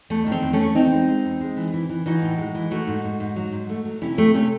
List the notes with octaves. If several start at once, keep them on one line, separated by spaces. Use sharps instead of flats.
E2 A3
D#3
C4
E2
A3 C#4
E2
E2 C4 D#4
G#3
G#3
E2
G#3
E3
E3
E3
E3 D#4 F#4
A2
G#3
E3
A3 D#4 F#4
G#2
G#2
G#2
F#3
G#2
A3
F#3
C3 C#4 E4
C3 A3
C3 A3 C#4